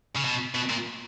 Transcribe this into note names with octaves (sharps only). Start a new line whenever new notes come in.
C#3
B2
B2
A#2